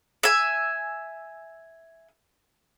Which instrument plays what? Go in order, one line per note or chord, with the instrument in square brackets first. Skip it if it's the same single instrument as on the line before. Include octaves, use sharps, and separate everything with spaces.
[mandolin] E5 G#5